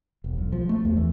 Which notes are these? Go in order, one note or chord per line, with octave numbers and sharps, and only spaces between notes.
E1
B1
F3
A3
E2
E3